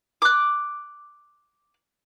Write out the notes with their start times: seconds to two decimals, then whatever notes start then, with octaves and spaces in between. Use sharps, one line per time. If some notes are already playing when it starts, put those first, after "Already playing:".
0.22 D6 F#6